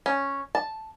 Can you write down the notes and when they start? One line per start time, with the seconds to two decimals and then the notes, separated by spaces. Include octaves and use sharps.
0.06 C#4
0.55 A5